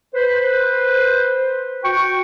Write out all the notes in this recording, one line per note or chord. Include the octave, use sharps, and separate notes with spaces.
B4 C5
F#4 G5 C#6